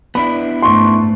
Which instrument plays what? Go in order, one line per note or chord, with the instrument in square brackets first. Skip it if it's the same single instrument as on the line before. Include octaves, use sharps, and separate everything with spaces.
[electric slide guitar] B3 D4 E4 [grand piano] B5
[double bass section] G#2 A3 [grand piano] C6 C#6